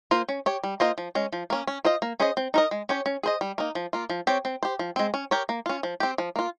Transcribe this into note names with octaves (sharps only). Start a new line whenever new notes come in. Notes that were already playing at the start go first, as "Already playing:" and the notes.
A#3 F4 C5
C#4
G4 C#5
G3
A#3 F4 C5 D#5
F3
G#3 C#4
F3
A#3 C#4
C#4
F4 C5 D#5
A#3
C#4 G#4 C5 D#5
C4
D#4 A#4 D#5
G#3
C#4 G4 C#5
C#4
G#4 C5 D#5
G3
A#3 D#4
F3
A#3 F4
F3
C4 G4 C#5
C4
G4 C5
F3
G#3 C4
C#4
G4 A#4 C#5
A#3
C#4 F4
F3
C4 G4
F3
A#3 F4